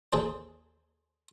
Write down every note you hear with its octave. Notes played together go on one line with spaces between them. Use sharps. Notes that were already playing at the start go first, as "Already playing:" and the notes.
D#2 G#4 A4 C5